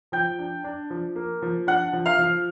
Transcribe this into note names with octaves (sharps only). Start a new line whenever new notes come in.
F3 G5 G6
D4
D4
F3
A#3
F3
D4 F#5 F#6
F3
F5 F6
F3